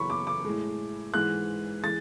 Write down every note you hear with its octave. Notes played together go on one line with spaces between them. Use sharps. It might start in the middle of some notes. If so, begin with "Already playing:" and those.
Already playing: F#2 C#3 E3 B5 C#6
D6
D6
A2 G#3
G#2 E3 G#3 F#6
E3 G#3 A6